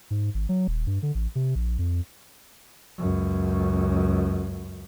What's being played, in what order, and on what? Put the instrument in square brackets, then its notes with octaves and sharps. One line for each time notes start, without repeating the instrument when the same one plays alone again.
[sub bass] G#2
G#1
F#3
D#1
G2
D3
A1
C3
A#1
F2
[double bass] C#2 F#2